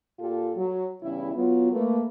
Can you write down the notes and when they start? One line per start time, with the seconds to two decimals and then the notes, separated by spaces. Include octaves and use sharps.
0.19 A#2 F4 G4 A4
0.56 F#3
1.01 E2 G2 C#3 E3 E4
1.35 F#3 B3 F4
1.72 A3 A#3 B4